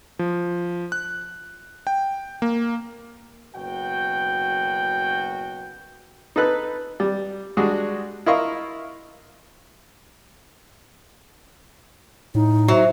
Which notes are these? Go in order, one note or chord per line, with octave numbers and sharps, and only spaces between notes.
F3
F#6
G5
A#3
F#1 B2 F#4 G5
D#4 A4 B4 F#6
G3
G3 G#3 D4 F#4 G#4
E4 F4 A#4 D#5 F5 C#6
A2 D#4
F#3 C5 E5